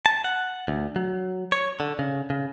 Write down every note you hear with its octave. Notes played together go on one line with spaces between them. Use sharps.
A5
F#5
D2
F#3
C#5
D3
C#3
C#3